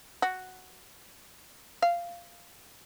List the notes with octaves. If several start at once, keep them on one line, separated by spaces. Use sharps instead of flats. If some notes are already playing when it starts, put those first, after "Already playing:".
F#4
F5